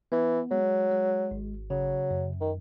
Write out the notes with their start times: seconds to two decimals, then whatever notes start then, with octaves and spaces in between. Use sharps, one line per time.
0.12 E3 B3
0.51 F#3 G#3
0.91 G#3
1.31 G#1
1.70 C#3 F#3
2.11 F#2
2.41 D#3